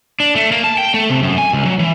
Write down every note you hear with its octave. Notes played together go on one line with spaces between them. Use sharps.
D4
A3
A#3
A5
G5
A3
C3
F#2
G#5
C#2
F#3
E3